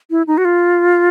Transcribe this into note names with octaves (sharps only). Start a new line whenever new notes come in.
E4
D#4
F#4
F4